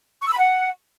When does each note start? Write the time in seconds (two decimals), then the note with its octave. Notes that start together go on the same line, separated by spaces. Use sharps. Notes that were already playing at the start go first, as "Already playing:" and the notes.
0.21 C#6
0.27 E6
0.33 B5
0.38 F#5